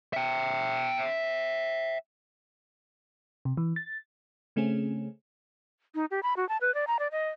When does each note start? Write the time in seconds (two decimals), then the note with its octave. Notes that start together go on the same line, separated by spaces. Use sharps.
0.13 E5 G5
3.45 C3
3.57 E3
3.76 A6
4.56 C#3 A3 C4 C#4 G#4
5.95 D#4
6.11 G4
6.23 B5
6.37 F#4
6.49 A5
6.61 B4
6.74 D5
6.87 A#5
6.99 D5
7.12 D#5